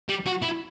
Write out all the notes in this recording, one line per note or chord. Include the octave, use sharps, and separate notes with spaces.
G3
F#4
E4